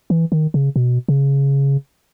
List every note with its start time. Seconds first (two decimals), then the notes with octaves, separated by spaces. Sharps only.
0.10 E3
0.32 D#3
0.54 C#3
0.76 B2
1.09 C#3